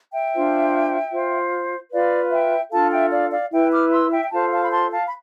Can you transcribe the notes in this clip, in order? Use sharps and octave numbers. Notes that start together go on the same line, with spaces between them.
E5 G5
D4 F4 C5
F4 C5
F4 B4 D5 F5
E5 G5
D4 F4 A4 F5 A5
E5 G5
D5 F5
D5 F5
E4 B4 E5 G5
D6 F6
C6 E6
E5 G5
G5
F4 A4 C5 F5 A5
F5 A5
B5
A5 C6
F5 A5
B5